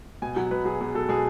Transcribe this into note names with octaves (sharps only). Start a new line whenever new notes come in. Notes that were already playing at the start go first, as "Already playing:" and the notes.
B2 G#5
F#3 F#5
B2 B4
F#3 G#4
B2 G#4
F#3 A4
B2 G#4